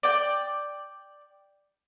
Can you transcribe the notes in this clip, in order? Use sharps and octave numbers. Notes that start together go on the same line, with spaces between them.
D5 G5